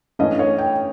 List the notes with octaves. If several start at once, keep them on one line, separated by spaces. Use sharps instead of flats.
G2 E3 A3 C#4 D#5
C#5
G5